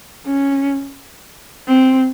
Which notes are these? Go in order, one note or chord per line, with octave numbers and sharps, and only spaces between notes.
C#4
C4